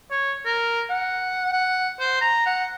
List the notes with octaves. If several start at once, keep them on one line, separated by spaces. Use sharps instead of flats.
C#5
A#4
F#5
F#5
C5
A#5
F#5